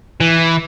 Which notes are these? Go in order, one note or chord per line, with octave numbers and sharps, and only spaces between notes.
E3